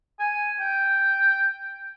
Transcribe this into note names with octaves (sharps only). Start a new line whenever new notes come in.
G#5
G5